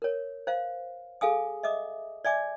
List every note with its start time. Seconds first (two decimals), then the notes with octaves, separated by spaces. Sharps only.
0.02 A#4 C#5
0.47 C5 F5
1.21 G#4 A4 F5 G#5 D#6
1.63 D#5 E5 D6 D#6
2.25 D5 E5 G#5 D6